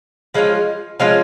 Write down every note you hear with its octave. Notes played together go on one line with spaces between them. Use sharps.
F3 G#3 C#4 F4
F3 G#3 C#4 F4 F5